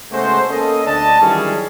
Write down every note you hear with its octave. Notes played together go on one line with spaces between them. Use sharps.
C#3 G#3 A3 B3 F#4 C5
A#3 B3 C#4 A4 D#5
D2 D4 D#5 A5
D#3 E3 F#3 G3 C#4 G#4